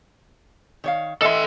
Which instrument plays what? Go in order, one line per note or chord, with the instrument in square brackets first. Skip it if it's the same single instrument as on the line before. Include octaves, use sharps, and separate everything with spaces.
[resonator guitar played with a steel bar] D#3 C#5 F5
[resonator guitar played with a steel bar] E3 [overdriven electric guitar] A4 C6 [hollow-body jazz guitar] D#5 E5